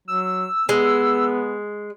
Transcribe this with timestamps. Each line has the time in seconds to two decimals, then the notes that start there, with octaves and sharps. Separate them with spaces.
0.08 F#3 E6
0.69 G#3 B3